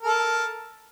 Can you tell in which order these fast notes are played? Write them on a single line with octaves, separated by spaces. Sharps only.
A#4 A4 A5